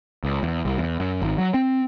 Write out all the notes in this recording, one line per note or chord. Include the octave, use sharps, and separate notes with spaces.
C#2
E2
C2
E2
F#2
G#1
F#3
C4